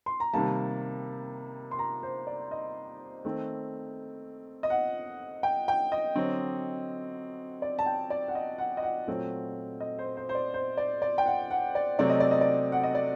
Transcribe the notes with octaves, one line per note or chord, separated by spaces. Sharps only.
C6
A#5
C3 D#3 G3 A#3 A5
C6
A#5
C5
D5
D#5
D#3 A3 C4
D#5
F#5
G5
G5
D#5
D3 F#3 C4
D5
A5
G5
D5
F#5
D#5
F#5
D#5
F#5
A#2 F#3 A3 C4
D#5
C5
C5
C5
D5
C5
D5
D5
G5
F#5
F#5
D5
C3 F#3 A3 C4 D5
D#5
D5
D#5
D5
F#5
D#5
D5